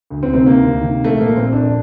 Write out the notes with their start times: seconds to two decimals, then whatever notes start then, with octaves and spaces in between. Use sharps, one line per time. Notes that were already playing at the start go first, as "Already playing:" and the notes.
0.10 D2
0.23 C4
0.33 C3 D#3 C4
0.46 A#3
0.57 D2
0.81 C3 D#3
1.04 A#1 A3
1.21 A#3
1.28 A#2
1.37 C4
1.53 A#1 D4